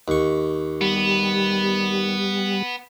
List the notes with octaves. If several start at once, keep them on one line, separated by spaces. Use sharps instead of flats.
D#2 C#6
G3 B3